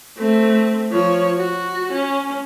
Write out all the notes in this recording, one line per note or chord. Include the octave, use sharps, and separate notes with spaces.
A3 C4
F3 C#5
F#4
C#4